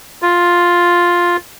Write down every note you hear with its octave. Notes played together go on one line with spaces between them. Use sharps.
F4